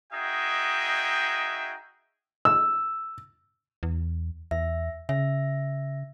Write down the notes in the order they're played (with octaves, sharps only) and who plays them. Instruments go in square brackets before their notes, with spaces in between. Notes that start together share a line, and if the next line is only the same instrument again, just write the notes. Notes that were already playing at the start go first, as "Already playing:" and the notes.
[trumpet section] D#4 F#4 G#4 D#5 E5 G5
[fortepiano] E6
[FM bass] E2
[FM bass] E2 [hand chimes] E5
[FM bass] C#3 [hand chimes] E5